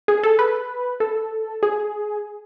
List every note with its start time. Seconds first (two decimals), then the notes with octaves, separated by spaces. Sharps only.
0.08 G#4
0.23 A4
0.39 B4
1.00 A4
1.63 G#4